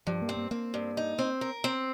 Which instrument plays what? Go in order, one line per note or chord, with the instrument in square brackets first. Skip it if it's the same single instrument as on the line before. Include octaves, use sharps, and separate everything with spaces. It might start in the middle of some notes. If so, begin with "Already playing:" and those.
[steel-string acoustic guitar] G2 [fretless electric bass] F3
[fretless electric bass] A#3
[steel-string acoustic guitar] C4
[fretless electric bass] A#3
[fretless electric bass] A#3 [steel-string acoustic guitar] C4
[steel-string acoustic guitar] G2
D#4
C4
A#4
C4